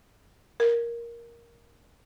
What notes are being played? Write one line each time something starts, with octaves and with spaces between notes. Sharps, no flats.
A#4